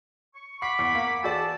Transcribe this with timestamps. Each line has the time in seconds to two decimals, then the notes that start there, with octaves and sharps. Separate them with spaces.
0.35 C#6
0.62 F#5 B5 C#6 D6 C7
0.79 E2
0.95 A#3
1.23 E3 F#4 G#4 D5 G5 A5 E6